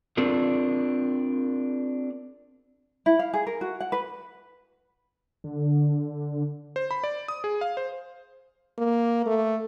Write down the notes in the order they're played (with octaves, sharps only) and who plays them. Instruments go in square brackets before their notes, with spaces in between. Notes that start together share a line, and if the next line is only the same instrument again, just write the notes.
[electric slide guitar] C4 D4 F4 G#4 A#4
[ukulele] E4
F5
G#4
A#4
F#4
F#5
B4
[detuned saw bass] D3
[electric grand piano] C5
B5
D5
D#6
G#4
F5
C5
[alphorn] A#3
A3